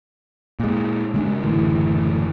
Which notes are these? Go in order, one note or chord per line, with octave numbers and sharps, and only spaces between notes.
A#2 G#3
C#3 G#3 D4
F#1 A2 D3 E3